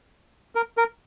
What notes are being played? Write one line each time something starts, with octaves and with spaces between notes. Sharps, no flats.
A#4
A#4